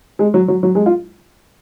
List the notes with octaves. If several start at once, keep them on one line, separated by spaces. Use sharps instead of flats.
G#3
F#3
F#3
F#3
G#3
F4